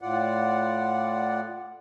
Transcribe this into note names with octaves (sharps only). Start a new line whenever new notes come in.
A2 F4 D5 F#5